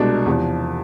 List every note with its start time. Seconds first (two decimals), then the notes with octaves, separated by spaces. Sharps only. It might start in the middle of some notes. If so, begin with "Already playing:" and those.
Already playing: C2 B2 G#3 D4
0.26 E2 C3 F3